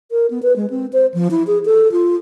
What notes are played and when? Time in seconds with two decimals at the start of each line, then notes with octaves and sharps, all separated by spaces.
0.11 A#4
0.30 B3
0.43 B4
0.56 G#3
0.70 C4
0.93 C5
1.14 F3
1.31 E4
1.47 G#4
1.65 A4
1.92 F4